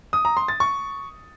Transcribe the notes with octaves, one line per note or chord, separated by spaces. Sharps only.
D#6
A#5
C6
A6
C#6